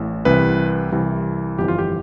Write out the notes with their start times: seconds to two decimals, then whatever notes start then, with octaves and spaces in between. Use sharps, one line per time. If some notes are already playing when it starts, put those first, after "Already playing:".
Already playing: A1 A2
0.25 C2 C3 E3 B4
0.92 C2 C3 E3
1.58 G1 F2 E3 G4
1.68 F4
1.78 G4